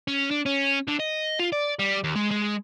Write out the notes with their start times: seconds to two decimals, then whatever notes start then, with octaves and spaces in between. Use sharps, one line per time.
0.08 C#4
0.31 D4
0.46 C#4
0.88 D3
0.99 D#5
1.39 F4
1.52 D5
1.79 G3
2.04 D#2
2.15 G#3
2.31 G#3